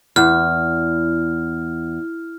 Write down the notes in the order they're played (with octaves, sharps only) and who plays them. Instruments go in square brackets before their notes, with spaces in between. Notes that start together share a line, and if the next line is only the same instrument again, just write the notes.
[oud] E2 [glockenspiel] F6